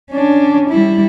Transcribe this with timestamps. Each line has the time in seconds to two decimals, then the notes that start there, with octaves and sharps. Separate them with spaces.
0.10 C#4 D4
0.70 G3 E4